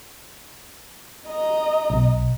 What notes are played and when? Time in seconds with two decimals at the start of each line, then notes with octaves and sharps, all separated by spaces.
1.28 D#5 A#5
1.90 B1